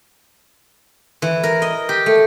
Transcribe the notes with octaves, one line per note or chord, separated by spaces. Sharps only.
E3
A#4
D#5
G4
A3